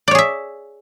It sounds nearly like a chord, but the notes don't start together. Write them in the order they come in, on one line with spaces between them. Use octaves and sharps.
D5 C#5 G#4 E5